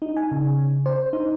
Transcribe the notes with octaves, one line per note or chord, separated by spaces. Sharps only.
D#4
G#5
C#3
C5
D#4